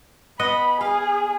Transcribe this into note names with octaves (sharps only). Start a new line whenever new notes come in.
B3 D#5 F#5 B5
G#4 F5